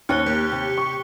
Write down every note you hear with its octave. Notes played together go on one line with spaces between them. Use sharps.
D#2 C#4 C5 C#5 F#6 C#7 G7
A#3 G4
C3
C#6